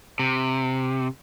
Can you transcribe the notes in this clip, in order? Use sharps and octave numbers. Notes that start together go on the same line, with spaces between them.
C3